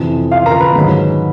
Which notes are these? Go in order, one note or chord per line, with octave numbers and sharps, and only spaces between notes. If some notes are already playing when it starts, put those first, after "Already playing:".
Already playing: F2 C3 E3
F4 F5
A#4 A#5
B4 B5
G#2 D#3 F#3